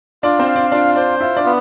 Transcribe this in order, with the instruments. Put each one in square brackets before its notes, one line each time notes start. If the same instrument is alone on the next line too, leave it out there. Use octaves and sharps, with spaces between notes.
[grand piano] D4 D5 [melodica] F4
[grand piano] C4 C5
[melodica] F5
[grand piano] D4 D5
[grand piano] D4 D5 [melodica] F4
[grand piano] D4 D5 [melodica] C5
[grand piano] E4 E5 [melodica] F4
[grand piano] D4 D5
[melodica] B3